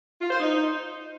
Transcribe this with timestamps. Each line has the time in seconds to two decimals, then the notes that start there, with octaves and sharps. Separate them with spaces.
0.21 F4
0.31 C5
0.40 D#4